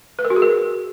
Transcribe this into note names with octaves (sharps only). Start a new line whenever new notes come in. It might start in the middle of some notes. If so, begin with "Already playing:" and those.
B4
A#4
F#4
G#4
A#4